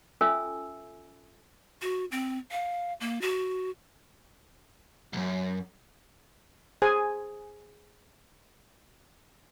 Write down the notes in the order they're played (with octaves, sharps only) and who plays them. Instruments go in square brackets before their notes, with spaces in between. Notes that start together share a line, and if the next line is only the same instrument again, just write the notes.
[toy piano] C#4 F4 A4 E5 G#5 E6
[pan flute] F#4
C4
F5
A#3
F#4
[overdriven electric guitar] B1 F#2
[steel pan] G#4 C5 G#5